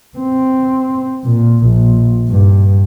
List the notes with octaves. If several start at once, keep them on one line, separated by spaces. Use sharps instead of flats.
C4
A#2
A#1
G2